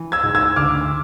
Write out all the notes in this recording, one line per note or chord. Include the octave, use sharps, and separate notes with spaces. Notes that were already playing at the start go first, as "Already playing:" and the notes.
Already playing: E3
E6 G#6
G#2
E6 G#6
D2 D6 F6